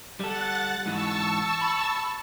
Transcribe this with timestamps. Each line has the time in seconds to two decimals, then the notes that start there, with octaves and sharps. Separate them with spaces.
0.20 G3 A4 F#5 F#6 A6
0.86 G#2 E3 A5 C#6 E6
1.61 B5